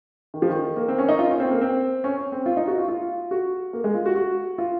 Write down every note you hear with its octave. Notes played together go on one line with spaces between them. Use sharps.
D#3
F3
D#3
A#3
C4
C#4
D#4
F4
C#4
C4
A#3
C4
C#4
C#4
C4
F4
D#4
F#4
F4
F4
F#4
A#3
G#3
F4
F#4
F#4
F4